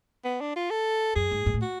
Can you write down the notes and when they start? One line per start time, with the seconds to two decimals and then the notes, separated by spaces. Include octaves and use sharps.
0.25 B3
0.41 D4
0.56 F4
0.71 A4
1.15 F#2 G#4
1.31 G#2
1.46 G#2
1.54 A2
1.62 F#4